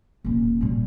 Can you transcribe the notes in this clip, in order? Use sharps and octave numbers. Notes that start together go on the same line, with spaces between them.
D#1 C#4
A#2 G3